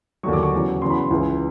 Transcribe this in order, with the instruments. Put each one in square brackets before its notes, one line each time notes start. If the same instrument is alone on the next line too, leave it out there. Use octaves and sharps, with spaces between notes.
[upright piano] D#2 D3 F#3 C#6
D6
C#6
E2 C#3 F#3
E2 C#3 F#3 C6
B5
C6
C#2 C#3 E3